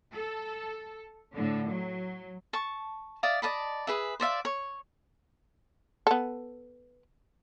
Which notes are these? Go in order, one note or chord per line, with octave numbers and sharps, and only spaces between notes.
A4
A2 D3
F#3
A5 C#6
D5 E5 F5 D#6
D5 D#5 A5 B5
G#4 B4 E5
C5 D5 E5 F5
C#5
B3 A4